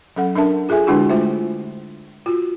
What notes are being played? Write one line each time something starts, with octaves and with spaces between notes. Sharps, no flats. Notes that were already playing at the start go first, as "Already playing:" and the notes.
F#3 C#4 A4 F#5
D4 A#4 E5 A5
F4 G#4 A4 E5 G#5
D3 G#3 D4 E4 F#4
A3 F4 C5 E5
F4 F#4